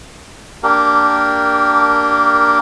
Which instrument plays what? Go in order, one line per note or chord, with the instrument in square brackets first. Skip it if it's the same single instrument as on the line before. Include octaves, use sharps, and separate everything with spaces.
[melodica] A#3 D4 G4 A#4